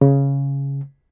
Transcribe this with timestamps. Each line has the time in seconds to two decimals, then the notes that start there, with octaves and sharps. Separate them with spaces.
0.01 C#3